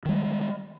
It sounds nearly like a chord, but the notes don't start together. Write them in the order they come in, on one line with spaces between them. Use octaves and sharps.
D#3 G3 G#3